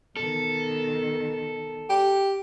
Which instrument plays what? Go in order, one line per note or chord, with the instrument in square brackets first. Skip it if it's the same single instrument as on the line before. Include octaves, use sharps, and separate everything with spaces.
[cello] B2 D#3 [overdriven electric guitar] A4
[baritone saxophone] G4